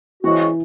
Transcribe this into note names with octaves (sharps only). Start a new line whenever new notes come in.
C#3 E3 G#3 C4 F#4